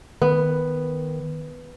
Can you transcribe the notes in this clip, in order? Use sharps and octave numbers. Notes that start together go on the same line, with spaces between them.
D#3 B3